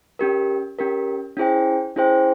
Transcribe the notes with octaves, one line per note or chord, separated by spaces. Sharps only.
C#4 G4 A#4
C#4 G4 A#4
C#4 E4 G#4 C5 G5
C#4 E4 G#4 C5 G5